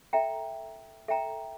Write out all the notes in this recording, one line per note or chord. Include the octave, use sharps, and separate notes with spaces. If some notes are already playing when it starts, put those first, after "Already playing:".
A4 E5 G5 A#5
A4 E5 G5 A#5